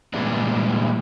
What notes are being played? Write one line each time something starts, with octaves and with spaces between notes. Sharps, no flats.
A#2 E3 G3 G#3 B3 D4